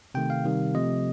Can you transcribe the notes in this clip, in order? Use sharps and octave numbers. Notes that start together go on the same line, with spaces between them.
C3 D#3 A3 G5
F5
C3 D#3 G3
C3 F3 A3 D#5